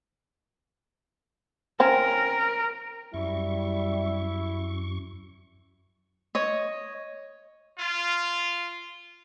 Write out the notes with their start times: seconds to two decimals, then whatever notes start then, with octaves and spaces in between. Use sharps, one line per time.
1.80 C4 C#4 A#4
3.14 F#2 G3 E4 E5 C#6
6.35 C#5 D#5
7.79 F4